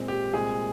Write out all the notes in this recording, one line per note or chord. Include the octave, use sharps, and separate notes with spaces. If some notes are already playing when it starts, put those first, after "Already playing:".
Already playing: A#2 G#3 C4
G4
C2 A#2 G#3 C4 G#4